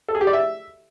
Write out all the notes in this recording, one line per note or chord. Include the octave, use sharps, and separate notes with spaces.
A4
G#4
G4
D5
E5